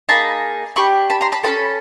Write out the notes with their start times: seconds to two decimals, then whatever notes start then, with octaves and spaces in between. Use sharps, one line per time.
0.09 A#3 D#4 G#4 A5 B5
0.76 D4 G4 B5 C#6
1.10 A5 B5
1.21 A#5 C6
1.32 A5 B5
1.43 C#4 F#4 A4 A5 B5